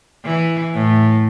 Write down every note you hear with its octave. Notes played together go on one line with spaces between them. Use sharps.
E3
A2